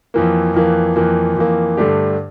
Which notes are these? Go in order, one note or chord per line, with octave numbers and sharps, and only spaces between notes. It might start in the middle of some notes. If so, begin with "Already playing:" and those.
F2 E3 A#3
F2 E3 A#3
F2 E3 A#3
F2 E3 A#3
G2 D3 A3 D4 G4